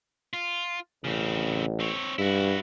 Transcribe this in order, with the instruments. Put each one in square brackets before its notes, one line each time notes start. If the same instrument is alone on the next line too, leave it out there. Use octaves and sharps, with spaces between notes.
[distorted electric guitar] F4
[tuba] A1 [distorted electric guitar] C#3 C4
[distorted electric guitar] C4 C#5
[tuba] G2 [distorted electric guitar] E4 F#4